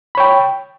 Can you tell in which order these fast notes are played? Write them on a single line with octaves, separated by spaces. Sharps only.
B5 C#5 G5